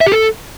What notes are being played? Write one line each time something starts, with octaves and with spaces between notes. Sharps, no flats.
E5
G4
A4